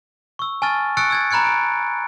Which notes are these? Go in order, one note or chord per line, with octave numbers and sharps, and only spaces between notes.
C#6 E6
G#5 A5 C#6 F6 A6
C#6 E6 F#6 A6 C#7 D7
E6 G#6 A6
A#5 B5 F#6 G#6 C#7
D7